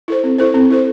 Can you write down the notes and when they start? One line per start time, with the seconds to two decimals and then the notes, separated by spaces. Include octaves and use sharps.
0.08 E4 A4 C5
0.24 C4
0.38 E4 A4 C5
0.54 C4
0.70 E4 A4 C5